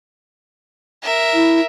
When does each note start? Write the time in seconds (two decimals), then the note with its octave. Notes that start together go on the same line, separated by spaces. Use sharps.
1.02 A#4 E5
1.34 E4